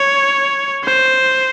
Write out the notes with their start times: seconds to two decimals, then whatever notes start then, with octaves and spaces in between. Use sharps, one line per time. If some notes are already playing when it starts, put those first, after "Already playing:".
Already playing: C#5
0.84 C5